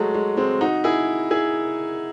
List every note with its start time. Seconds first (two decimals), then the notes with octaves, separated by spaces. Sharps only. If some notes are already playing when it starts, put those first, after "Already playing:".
Already playing: F#3 G#3 A3
0.14 G#3
0.37 G#3 C4
0.61 D#4 F#4
0.84 E4 G#4
1.31 E4 G#4